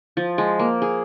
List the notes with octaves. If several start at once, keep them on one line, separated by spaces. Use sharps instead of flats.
F3
G#3
A#3
G#4